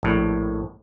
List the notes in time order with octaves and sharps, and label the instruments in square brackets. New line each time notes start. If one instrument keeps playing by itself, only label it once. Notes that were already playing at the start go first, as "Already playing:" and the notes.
[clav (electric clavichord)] A#1 A2